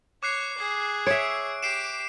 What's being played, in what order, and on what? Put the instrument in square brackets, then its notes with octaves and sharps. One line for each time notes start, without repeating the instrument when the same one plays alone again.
[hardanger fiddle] C#5 [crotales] D6 F#6 C7
[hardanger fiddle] G#4
[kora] C#5 E5 [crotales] D7
[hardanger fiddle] G4 [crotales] C7 D7 E7